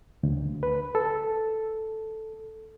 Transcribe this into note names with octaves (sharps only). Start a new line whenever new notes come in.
D2
B4
A4